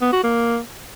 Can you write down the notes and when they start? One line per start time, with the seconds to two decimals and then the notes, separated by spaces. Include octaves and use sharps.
0.01 B3
0.12 F#4
0.23 A#3